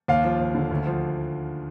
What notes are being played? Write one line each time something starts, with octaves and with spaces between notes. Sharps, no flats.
D#2 F5
F3
D#2
D3
D2
F3